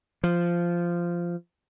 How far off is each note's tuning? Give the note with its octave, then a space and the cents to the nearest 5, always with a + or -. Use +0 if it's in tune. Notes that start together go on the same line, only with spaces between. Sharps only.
F3 -10